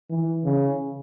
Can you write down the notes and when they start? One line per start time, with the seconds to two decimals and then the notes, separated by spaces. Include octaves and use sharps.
0.10 E3
0.45 C#3